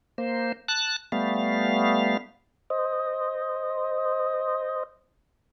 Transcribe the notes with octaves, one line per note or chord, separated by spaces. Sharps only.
A#3 C5
A5 F#6
G3 A3 B3 F5
C5 D#5